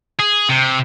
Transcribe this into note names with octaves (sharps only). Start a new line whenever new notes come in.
G#4
C3